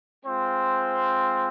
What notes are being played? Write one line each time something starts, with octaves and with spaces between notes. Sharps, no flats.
G#3 C4 F4 C5